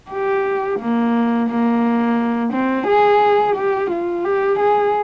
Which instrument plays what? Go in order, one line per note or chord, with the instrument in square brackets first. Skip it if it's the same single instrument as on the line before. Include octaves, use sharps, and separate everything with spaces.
[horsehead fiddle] G4
A#3
A#3
C4
G#4
G4
F4
G4
G#4